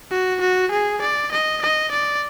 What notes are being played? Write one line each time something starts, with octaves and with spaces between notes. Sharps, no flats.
F#4
F#4
G#4
D5
D#5
D#5
D5